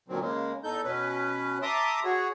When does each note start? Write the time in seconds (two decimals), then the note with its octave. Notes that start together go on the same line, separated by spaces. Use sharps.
0.08 A#2 D3 D#3 F#3 C4
0.20 C#3 G#3 A#3
0.64 E2 D#4 A4 G6
0.84 B2 C#4 B4
1.62 E5 A5 A#5 C6 D6 D#6
2.05 F#4 G#4 C#5